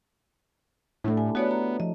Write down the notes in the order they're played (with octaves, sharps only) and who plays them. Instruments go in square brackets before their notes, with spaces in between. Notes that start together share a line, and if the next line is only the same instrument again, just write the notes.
[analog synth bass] A2 [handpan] A3 D4 E4
[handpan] G4 [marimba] G#5
[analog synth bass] B3 [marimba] F#4 C#5 D5
[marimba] A#5
[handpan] F3 [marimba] D#5